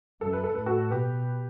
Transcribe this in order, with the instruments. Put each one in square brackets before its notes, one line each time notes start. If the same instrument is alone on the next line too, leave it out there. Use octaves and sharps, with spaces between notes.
[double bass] F#2 [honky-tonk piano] A4
[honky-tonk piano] B4
A4
[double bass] A2 [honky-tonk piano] B4
[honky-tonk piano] F#4 A4
[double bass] B2 [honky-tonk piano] G4 B4